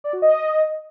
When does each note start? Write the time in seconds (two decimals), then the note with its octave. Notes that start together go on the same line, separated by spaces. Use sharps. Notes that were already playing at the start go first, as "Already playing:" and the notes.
0.04 D5
0.13 F#4
0.22 D#5